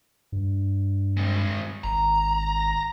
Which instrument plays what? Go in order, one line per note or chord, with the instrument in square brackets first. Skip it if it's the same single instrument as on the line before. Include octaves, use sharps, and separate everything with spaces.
[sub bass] G2
[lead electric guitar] G#3 C4
[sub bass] G#1 [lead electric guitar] A#5